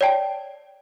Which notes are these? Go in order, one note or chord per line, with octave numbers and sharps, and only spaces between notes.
C#5 D5 G5 A5